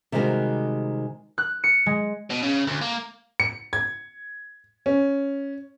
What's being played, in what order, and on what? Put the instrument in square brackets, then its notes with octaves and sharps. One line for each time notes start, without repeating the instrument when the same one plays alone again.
[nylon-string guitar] C3 D#3 G3 G#3 F#4 A#4
[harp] F#6
C#7
G#3
[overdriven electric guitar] B2
C#3
D2
A#3
[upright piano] C#7
G#6
C#4